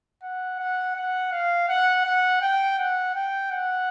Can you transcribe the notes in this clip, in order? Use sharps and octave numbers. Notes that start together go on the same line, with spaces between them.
F#5
F#5
F#5
F5
F#5
F#5
G5
F#5
G5
F#5